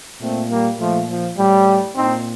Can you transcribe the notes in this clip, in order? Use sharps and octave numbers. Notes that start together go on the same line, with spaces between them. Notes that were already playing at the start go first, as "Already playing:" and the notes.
A#2 A3 C4
G3 A#3
A#2 F3 A3
F3
A2 G3
A#2 C4 D#4